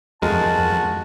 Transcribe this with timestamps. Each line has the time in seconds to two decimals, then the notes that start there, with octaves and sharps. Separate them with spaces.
0.22 F2 G#3 F#4 A#4 A5